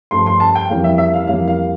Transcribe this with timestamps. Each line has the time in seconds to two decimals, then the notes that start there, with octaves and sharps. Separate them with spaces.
0.11 G2 F3 A3 C6
0.26 C6
0.40 A5
0.55 G5
0.69 F2 E3 G3 A#3 F5
0.84 E5
0.98 E5
1.14 F5
1.27 F2 E3 G3 A#3 F5
1.48 F5